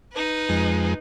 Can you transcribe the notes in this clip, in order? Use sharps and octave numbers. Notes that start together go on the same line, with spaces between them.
D#4 B4
F2 G#3